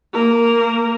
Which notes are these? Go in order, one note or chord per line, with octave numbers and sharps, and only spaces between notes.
A#3 A#4